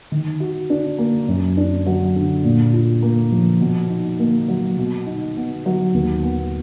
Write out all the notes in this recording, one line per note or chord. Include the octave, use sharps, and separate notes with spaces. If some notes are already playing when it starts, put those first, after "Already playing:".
D#3
F#4
D4
A#3
F#2
D4
F#3
D3
A#2
F4
A#3
F3
B2
D#4
A#3
F#3
B2
D#4
B3
F#3
D#2
B3